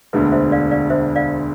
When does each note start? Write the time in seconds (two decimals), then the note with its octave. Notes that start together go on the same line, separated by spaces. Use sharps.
0.13 E1 D2 D3 B4
0.32 C5 E5
0.52 D5 F5
0.71 D5 F5
0.90 C5 E5
1.16 D5 F5